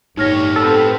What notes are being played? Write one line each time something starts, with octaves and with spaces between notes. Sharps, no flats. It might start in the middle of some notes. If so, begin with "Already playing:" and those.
G1 A2 D#4 G4 C#5 F6 A#6
B3 C4 A4